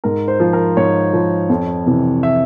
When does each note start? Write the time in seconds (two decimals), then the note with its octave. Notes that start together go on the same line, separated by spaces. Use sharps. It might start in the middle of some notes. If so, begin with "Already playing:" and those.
0.04 G#2 A#4
0.28 C5
0.40 F3
0.53 A#4
0.77 G#2 C#5
1.13 F3
1.50 F2
1.86 C3 E3
2.23 E5